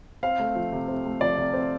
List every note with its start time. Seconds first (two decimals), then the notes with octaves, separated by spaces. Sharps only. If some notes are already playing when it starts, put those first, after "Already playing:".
0.23 C4 F5
0.40 A3
0.56 F3
0.72 C3
0.88 C4
1.05 A3
1.21 F3 D5
1.38 C3
1.54 C4